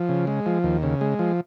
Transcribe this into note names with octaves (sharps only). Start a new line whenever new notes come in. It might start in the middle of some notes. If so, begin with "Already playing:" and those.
Already playing: F3
C#3
G#3
F3
D#2
C#3
G#3
F3